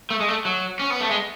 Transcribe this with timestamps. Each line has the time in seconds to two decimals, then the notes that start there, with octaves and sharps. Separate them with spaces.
0.10 A3
0.20 G#3
0.28 A3
0.45 F#3
0.79 C#4
0.90 B3
1.01 A3
1.11 G#3